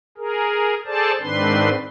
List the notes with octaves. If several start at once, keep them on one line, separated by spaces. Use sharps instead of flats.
G#4 A#4
G#4 A4 C5 D5 A5
G#2 D#3 C4 D4 B4 C6